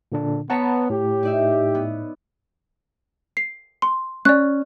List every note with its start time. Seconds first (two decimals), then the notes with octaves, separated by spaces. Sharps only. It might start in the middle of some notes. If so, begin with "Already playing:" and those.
0.12 A#2 D3 D4
0.50 B3 C#5 F#5 A5 A#5 B6 C#7
0.90 A2 G4
1.23 D#4 D5 E5
1.75 B3
3.37 C7
3.82 C6
4.25 C#4 D5 F#6